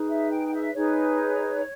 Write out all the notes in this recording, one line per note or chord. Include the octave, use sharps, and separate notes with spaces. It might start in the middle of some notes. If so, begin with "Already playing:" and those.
Already playing: D#4 G#4 B4
E5
G5
G5
E5
D#4 G#4 B4 C#5